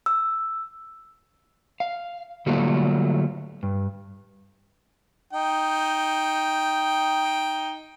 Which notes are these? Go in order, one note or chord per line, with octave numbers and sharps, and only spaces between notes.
E6
F5
D3 F#3 G3 A3 A#3 F4
G2
D#4 G5